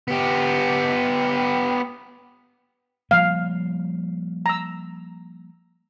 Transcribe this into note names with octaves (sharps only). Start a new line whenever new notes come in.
B3 G4
F3 G3 A#3 F5
A#5 E6